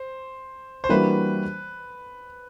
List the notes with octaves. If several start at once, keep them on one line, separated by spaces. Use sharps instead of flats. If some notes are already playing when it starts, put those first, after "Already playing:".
Already playing: C5
C5
E3 G3 A#3 D4 F#4 B4